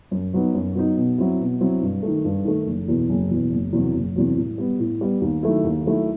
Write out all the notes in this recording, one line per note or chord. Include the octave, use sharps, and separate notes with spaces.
F#2
F#3 B3 D#4
F#2
F#3 B3 D#4
B2
F#3 C4 E4
B2
F#3 C4 E4
G2
D#3 A3
G2
D#3 A3
F#1
E2 B2
F#1
E2 B2
F#1
E2 C3 F#3
F#1
E2 C3 F#3
A2
G3 B3
A2
G3 B3
D#2
D#3 F#3 A3 E4
D#2
D#3 F#3 A3 E4